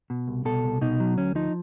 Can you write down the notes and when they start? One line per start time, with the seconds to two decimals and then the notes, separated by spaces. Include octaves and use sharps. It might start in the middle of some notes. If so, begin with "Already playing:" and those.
0.10 B2
0.28 C2
0.45 B2 A4
0.64 C2
0.81 B2 D#4
1.00 F#3
1.18 D2 C#4
1.35 F3 D#4